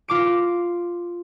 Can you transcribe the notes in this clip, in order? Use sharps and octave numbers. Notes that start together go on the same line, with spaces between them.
F4 D6 D7